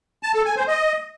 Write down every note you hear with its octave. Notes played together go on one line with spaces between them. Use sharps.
A5
A4
G#5
C5
D#5